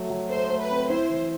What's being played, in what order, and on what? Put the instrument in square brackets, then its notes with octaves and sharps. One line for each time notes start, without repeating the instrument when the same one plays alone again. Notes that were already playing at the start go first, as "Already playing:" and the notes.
Already playing: [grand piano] F#3 A3
F#3
[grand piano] A3 [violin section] C5
[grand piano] A3
[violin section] B4
[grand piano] C4
[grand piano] E4 [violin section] C5
[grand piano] E3